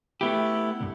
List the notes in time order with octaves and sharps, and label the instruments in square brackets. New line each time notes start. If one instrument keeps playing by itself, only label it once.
[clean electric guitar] A3 B3 G4 [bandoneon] E4
[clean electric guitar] C2 G2